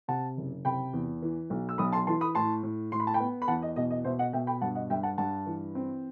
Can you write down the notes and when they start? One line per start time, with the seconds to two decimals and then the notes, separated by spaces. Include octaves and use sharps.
0.08 C3 F#5 A5
0.37 F#1
0.65 C3 G5 B5
0.93 E2
1.22 E3
1.50 B1
1.69 E6
1.78 B1 B5 D#6
1.92 A5 C6
2.07 E3 A5 C6
2.21 B5 D#6
2.35 A2 A5 C6
2.63 A2
2.92 A2 C6
3.00 B5
3.07 A5
3.14 G5 B5
3.20 B3
3.42 B5
3.48 E2 F#5 A5
3.62 D#5
3.76 B2 D#5
3.90 D#5
4.04 B2 C5 E5
4.19 D#5 F#5
4.33 B2 E5 G5
4.47 G5 B5
4.61 G2 F#5 A5
4.75 D#5 F#5
4.90 G2 E5 G5
5.03 F#5 A5
5.18 G2 F#5 A5
5.46 E3
5.75 C4